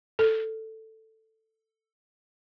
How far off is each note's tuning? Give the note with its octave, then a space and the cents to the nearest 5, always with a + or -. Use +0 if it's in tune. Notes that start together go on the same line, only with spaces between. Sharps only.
A4 +10